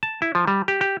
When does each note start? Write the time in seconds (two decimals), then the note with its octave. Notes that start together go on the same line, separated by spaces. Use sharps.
0.03 A5
0.22 E4
0.35 F3
0.47 G3
0.68 G4
0.81 G4